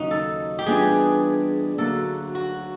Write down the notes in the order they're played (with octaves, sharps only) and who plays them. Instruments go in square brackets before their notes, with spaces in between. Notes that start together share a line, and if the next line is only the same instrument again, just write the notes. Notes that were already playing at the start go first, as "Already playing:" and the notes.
Already playing: [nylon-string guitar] D#2 C#3 F#3 C#4 [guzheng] D#4
[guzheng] A4
G4
[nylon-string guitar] E3 G3 B3 D4 F4 [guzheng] G#4
[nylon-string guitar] D2 D3 F#3 A#3 D4 [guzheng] A4
[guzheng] F#4